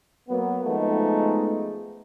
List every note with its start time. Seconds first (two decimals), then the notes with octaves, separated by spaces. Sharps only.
0.29 F#3 A#3 B3
0.64 F3 G#3 A3 B3 D#4